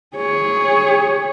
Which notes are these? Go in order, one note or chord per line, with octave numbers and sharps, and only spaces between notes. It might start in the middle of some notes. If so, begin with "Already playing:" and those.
G#4 C#5